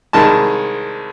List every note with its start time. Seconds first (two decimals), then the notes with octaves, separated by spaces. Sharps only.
0.13 C2 D#3 G#3 A5